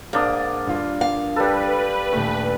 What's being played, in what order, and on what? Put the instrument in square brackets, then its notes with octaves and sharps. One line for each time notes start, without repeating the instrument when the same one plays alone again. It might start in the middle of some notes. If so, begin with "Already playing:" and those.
[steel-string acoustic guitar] G#2 [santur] A#3 D4 D#6
[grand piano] G2 F4
[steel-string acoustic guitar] F5
[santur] G3 A4 [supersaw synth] B4
[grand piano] D#1 A3